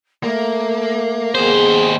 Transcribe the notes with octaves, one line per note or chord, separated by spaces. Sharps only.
A3 A#3
D#2 B3 G#4 C5